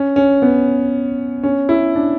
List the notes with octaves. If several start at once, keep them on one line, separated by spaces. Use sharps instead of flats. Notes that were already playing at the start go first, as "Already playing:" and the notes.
Already playing: C#4
C#4
B3
C#4
E4
D4